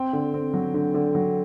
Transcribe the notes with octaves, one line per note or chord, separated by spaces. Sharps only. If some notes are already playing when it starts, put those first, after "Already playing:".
Already playing: C4 G5
D3
C4
F#3
D3
D3
F#3